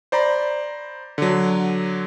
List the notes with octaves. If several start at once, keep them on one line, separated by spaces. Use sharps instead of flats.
C5 D5 A#5 B5
D3 F#3